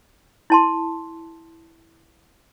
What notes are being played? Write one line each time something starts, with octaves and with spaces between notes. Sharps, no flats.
E4 A5 C6